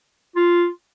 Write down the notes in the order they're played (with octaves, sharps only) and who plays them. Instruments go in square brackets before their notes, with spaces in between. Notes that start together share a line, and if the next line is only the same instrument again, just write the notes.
[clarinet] F4